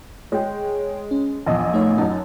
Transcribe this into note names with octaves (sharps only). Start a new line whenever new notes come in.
G#3 G#4 C#5 G5
C#4
A#1 E2 D#5 A5
A3 D#4 C#5
F#2 C#4 D#4 F#5 A5